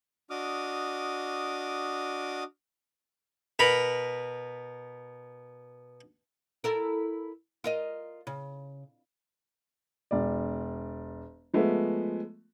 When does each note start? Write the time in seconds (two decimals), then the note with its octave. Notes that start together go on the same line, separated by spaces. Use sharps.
0.30 D4 F#4 D#5 D6 D#6 F6
3.59 B2 A#4 B5
6.64 E4 A4 A#4
7.64 F4 A#4 D#5
8.27 C#3
10.11 E1 D5
11.53 F3 G#3 A3 B3